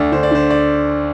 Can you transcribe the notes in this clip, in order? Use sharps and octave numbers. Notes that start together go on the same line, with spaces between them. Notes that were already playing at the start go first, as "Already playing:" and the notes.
Already playing: D2 D3 D5
D3 C5
D5
D3 C5
D5